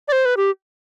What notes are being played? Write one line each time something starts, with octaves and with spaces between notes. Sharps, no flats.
D5
C5
B4
G4